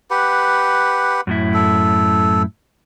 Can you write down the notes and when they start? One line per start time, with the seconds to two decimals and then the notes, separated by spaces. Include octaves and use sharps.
0.11 G4 B4 F#5
1.27 F#2 A2 E4
1.54 A4